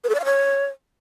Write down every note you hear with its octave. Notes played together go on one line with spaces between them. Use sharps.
B4
A4
D5
F5
C#5